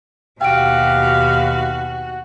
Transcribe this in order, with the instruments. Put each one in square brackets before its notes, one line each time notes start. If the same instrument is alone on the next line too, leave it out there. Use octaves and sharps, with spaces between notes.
[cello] D#2 B2 [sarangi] F#4 [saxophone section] G4 F5 [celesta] G5 D7